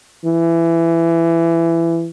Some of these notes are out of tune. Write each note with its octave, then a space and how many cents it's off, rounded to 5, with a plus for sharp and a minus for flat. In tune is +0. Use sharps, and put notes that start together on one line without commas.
E3 +20